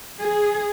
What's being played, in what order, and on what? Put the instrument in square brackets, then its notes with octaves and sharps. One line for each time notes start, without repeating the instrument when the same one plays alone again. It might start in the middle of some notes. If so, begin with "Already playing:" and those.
[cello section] G#4